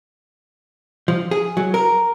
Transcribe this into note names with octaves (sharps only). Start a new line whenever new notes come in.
F3
G#4
F#3
A#4